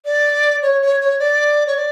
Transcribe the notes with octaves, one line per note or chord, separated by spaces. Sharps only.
D5
C#5
C#5
C#5
D5
C#5
D5